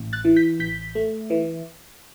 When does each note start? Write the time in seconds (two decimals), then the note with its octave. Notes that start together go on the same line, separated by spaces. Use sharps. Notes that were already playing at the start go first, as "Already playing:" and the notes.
Already playing: A1
0.13 F#6 A6
0.25 E3
0.36 G6 B6
0.60 A1 G6 B6
0.95 A3
1.30 E3